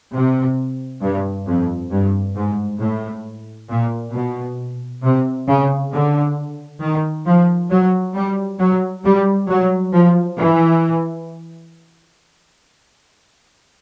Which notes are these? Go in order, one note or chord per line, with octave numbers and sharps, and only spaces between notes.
C3
G2
F2
G2
G#2
A2
A#2
B2
C3
C#3
D3
D#3
F3
F#3
G3
F#3
G3
F#3
F3
E3